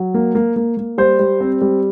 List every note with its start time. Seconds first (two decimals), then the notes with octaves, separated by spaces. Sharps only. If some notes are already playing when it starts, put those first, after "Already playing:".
Already playing: F#3
0.14 A#3
0.35 A#3
0.56 A#3
0.77 A#3
0.98 G3 C5
1.19 G3
1.41 C4
1.61 G3